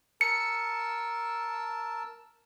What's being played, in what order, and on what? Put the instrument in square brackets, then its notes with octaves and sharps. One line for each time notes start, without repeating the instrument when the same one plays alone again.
[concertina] A#4 A5 E6 [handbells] C#7